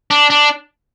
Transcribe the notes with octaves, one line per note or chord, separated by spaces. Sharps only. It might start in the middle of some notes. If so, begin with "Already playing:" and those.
D4
D4